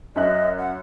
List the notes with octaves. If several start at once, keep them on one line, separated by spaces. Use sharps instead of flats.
F#2 D#5 E5 F#6
F#5